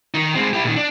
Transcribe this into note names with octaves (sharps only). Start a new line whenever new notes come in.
D#3 D#4
G#3 C4
E4 G4
A#2 D#3
D4